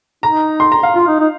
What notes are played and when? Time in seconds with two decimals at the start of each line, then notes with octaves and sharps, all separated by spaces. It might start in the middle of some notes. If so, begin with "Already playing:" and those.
0.23 D#4 A#5
0.60 C6
0.72 A#5
0.83 F5
0.95 F4
1.07 D#4
1.19 D#4